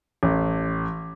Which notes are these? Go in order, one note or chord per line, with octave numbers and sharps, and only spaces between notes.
A1